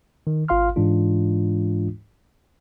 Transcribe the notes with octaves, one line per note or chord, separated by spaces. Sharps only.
D#3
G#1 F4 F5 C6 F6
G#2 E3 G#3 D4 F4